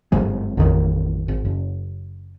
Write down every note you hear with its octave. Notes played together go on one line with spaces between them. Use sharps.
G1 G#2 F#3 G#3
A1 F2 D#3
G#1
F#1